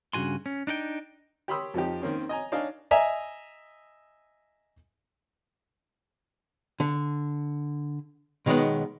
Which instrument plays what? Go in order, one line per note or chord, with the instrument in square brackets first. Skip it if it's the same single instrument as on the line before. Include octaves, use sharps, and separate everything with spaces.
[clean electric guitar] G2 C#3 E3 F#4 G#5 C6
C#4
D4 D#4 G#4 G5
[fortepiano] G4 C#5 B5 C6 D#6 E6
F2 F3 D#4 G4
D#3 A#3 C4 C#4
D#5 G#5 A#5
D4 D#4 C#5 D#5 F5 G#5
D#5 E5 G#5 A#5
[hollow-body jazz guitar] D3
B2 D#3 F#3 G#3 B3